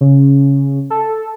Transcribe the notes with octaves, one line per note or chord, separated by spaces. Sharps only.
C#3
A4